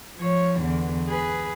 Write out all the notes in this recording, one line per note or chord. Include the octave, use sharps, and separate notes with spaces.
F3 C#5
E2 D3
G#4 B4